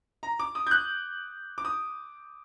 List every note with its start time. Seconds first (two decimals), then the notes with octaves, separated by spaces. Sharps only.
0.23 A#5
0.40 D6
0.55 D#6
0.67 G6
0.71 F#6
1.58 D6
1.65 D#6